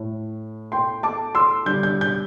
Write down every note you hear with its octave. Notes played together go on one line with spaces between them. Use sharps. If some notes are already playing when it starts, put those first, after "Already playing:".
Already playing: A2 A3
G5 C6
A5 D6
C6 E6
D3 G3 G6
G6
G6